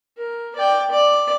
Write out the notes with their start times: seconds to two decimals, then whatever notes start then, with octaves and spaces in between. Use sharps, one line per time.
0.17 A#4
0.56 D5 G5
0.90 D5